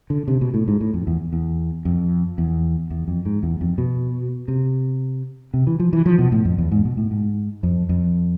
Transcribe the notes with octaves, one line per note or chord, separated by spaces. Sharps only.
D3
C3
B2
A2
G#2
A2
F2
E2
E2
F2
E2
E2
F2
G#2
E2
F2
B2
C3
C3
E3
F3
E3
F3
B2
A2
F2
E2
G#2
B2
A2
G#2
F2
F2